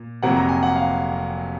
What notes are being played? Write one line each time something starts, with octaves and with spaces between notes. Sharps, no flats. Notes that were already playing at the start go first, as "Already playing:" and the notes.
Already playing: A#2
F1 F2 C3 F#3 A#3 F#5
A#5
G#5
F#5
F5